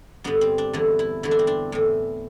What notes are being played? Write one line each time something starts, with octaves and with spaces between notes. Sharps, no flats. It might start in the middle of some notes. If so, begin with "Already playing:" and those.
G2 D3 B3
C4
D4
E2 D3 E4
E4
E2 D3 E4
D4
C4
D4
A2 E3